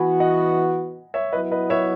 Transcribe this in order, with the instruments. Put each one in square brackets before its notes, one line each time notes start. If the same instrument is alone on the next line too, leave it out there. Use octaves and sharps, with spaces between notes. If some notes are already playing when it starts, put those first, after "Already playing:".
Already playing: [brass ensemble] E3 B3 F#4 [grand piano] G#5 B5
[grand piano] D#5 F#5
C#5 E5
[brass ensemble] F#3 B3 E4 [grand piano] B4 D#5
[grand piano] B4 D#5
C#5 E5